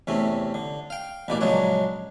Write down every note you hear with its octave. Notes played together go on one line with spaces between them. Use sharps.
E2 C3 A3 C#4
D3
F5 G5
A1 B2 E3 A#3 D5
A#1 C#3 F#3 G#3 D4 C#5